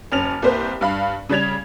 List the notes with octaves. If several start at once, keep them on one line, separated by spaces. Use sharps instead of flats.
F#1 C#4 F6 F7
C2 A#3 B4 C5
G2 F5 B5
C#3 G3 G#6 F7